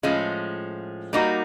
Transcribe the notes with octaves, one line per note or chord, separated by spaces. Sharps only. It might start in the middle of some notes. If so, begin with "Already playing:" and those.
A2 F3 G#3 C#4 F4
G3 A#3 D#4 F#4